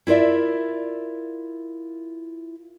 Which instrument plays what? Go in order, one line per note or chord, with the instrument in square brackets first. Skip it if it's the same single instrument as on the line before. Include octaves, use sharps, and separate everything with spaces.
[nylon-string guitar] E4 F4 A#4 D5 E5